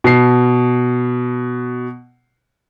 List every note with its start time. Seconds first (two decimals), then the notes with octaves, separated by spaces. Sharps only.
0.04 B2 C7